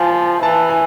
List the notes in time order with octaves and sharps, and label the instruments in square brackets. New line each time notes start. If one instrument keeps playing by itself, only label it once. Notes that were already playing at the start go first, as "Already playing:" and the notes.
Already playing: [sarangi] F3 [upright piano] G#5 A5
[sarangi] E3 [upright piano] A5
[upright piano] G#5